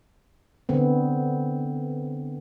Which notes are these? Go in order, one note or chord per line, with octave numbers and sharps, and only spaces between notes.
D3 B3 C4